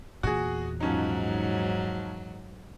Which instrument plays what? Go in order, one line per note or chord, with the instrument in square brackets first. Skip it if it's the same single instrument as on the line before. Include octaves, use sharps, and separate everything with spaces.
[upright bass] E2 A#2 [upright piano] F#4 G#4
[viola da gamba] G#2 F#3 [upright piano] F3 C#4 D#4